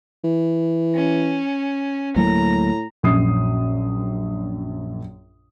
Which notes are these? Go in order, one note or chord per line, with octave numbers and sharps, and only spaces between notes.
E3
C#4
D2 A2 F#3 A#3 A#5
A#1 F#2 D#6 C7